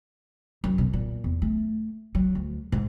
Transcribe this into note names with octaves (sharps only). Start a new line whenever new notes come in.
F#2
B2
A#2
E2
A3
F#3
D2
G#2